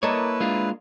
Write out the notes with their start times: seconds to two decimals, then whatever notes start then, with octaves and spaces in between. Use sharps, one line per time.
0.03 A#3 E4 A4 B4 C#5 D#5
0.40 G#3 D4 F4